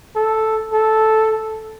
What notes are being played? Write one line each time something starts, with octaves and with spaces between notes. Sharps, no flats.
A4
A4